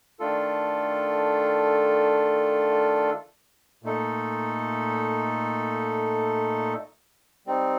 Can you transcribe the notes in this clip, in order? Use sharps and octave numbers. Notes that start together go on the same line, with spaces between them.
D#3 A3 D4 F4 A4
A#2 A3 D#4 A4
G3 C4 D#4